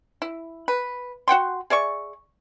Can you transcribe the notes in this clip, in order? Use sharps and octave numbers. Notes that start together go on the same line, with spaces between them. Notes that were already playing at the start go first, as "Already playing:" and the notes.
E4
B4
F#4 F#5 G5 C6
G#4 D5 E5 C#6